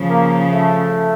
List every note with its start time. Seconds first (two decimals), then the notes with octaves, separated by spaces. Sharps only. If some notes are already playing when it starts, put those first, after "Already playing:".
Already playing: C#3 F3
0.08 A#3
0.51 A3